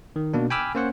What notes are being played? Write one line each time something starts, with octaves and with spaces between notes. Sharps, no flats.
D#3
B2 A#3 D4
G5 G#5 B5 D6 E6 F6
A#3 C#4 C5 C#5 F#5